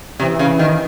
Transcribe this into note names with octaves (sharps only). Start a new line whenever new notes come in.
C3 E3
C#3
D#3